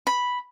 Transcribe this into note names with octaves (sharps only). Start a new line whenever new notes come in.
B5